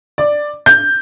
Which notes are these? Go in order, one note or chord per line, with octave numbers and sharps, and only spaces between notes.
D5
G6